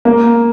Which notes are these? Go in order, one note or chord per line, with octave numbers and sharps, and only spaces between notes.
A#3